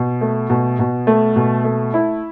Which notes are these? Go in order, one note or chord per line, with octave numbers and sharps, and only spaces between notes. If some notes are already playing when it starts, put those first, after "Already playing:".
Already playing: B2
A3
B2
B2
A3
B2
A3
E4